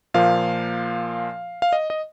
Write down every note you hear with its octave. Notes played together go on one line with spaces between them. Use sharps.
A#2 F3 A#3 F5
F5
D#5
D#5